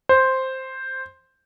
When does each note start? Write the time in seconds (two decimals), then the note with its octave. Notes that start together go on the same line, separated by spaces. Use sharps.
0.09 C5